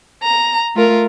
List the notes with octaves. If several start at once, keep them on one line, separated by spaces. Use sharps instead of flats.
A#5
A3 F4 A#4